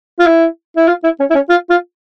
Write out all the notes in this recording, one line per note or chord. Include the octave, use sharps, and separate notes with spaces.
F4
E4
E4
F4
E4
C#4
E4
C#4
F4
F4